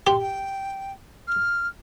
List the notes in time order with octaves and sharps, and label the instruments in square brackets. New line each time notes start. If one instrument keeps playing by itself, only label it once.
[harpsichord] G4 [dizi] C6
[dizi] G5
F6